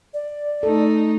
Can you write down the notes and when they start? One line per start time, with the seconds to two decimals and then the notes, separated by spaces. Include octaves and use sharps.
0.14 D5
0.63 A3 D#4 A4